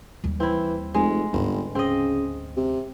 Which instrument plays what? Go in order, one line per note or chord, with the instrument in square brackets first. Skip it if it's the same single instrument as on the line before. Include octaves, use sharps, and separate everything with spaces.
[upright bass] D#2 G3
[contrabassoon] E3 [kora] C4 E4
[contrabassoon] F1 [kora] G#3
[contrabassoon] G1 [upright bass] D2 G#2
[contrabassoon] C#3 [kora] C4 D#5
[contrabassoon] C3